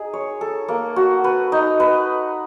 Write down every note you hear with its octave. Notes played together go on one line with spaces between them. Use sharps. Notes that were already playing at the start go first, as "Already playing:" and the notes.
Already playing: D#4 G#4
C#5
A4
A#3
F#4
B4
D#4
B4